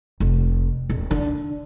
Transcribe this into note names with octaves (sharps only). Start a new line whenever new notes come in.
F1
D#1
D3